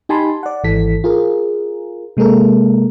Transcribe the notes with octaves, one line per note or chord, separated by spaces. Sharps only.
D#4 G4 G#5 A5 B5 C6
D5 F#5
G#1 E3 A4 B6
F4 G#4 A#4
C3 G#3 A#3 A4 A#4